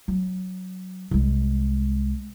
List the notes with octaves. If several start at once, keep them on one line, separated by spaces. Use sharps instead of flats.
F#3
C2 G#3